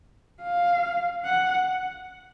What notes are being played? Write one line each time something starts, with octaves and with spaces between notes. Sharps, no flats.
F5
F#5